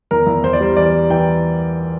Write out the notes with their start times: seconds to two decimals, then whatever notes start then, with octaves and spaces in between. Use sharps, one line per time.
0.11 E2 A#4
0.27 E2
0.44 E2 C5
0.53 D5
0.60 G3 C5
0.77 E3 D5
0.94 G3
1.10 E3 G5